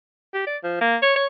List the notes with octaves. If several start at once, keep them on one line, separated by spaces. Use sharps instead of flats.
G4
D5
F3
A#3
C#5
C#5